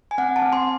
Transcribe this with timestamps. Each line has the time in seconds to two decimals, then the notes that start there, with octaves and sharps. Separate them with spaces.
0.11 G#5
0.18 C4 F#5
0.36 A5
0.42 C4
0.53 C6